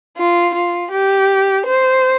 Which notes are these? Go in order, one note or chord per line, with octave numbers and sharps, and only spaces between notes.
F4
F4
G4
C5